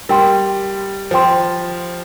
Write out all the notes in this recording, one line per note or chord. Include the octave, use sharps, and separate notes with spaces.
G3 A#4 G5 C6
F3 C5 G5 C6